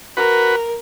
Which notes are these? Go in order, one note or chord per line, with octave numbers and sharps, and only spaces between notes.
F#4 A#4 B4